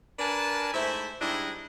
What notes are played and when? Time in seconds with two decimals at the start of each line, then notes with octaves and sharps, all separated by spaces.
0.19 D4 A#4 B4 G#5 A5
0.74 G#2 A3 E4 C5 E5
1.21 G#2 G3 D4 E4 D#5